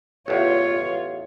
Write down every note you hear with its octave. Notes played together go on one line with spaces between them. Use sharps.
A1 E2 F4 C#5